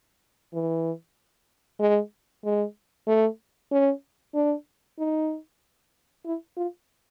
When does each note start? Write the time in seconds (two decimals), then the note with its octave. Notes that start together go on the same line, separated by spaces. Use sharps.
0.53 E3
1.80 G#3
2.44 G#3
3.07 A3
3.72 C#4
4.35 D4
4.98 D#4
6.26 E4
6.57 F4